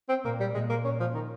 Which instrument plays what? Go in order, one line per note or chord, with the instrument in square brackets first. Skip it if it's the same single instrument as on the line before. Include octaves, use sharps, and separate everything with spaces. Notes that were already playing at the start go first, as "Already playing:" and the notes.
[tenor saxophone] C4
[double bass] A#2 [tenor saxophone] A#3
[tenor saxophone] G3
[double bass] A#2 [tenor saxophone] G#3
[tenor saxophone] A#3
[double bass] A#2 [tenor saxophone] C#4
[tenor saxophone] F3
D#3